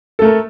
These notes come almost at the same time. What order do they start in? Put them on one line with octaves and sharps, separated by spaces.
A4 A3 A#4